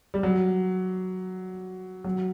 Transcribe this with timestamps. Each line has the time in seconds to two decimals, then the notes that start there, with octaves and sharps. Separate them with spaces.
0.14 G3
0.23 F#3
2.04 F#3